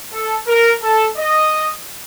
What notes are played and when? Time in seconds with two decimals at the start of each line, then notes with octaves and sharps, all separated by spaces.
0.13 A4
0.47 A#4
0.82 A4
1.17 D#5